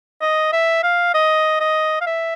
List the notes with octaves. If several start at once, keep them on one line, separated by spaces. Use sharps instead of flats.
D#5
E5
F5
D#5
D#5
F5
E5